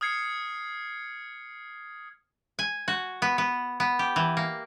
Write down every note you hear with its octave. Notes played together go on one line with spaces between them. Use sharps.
D#6 F6 G#6 C7 C#7
G#5
F#4
B3
B3
B3
G4
E3
A#3